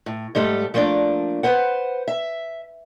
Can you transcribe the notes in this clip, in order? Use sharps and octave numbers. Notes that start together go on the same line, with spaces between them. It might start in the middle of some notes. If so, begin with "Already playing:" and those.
A2
G#2 G3 A3 A4
F3 A3 A#3 D4 D5
B4 C5 F#5
E5